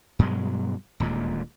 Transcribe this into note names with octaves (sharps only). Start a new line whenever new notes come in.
G2 B2 F#3 G#3
D#1 D2 A#2 G#3